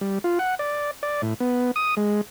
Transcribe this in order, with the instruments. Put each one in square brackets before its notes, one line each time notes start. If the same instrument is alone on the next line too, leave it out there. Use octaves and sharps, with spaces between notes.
[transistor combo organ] G3
F4
F#5
D5
D5
A2
B3
D#6
G#3